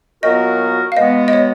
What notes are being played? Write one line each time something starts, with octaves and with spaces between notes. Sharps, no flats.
A#2 F#3 B3 F#4 A#4 D#5
F5
B2 G#3 B3 D#5
D#5
C#5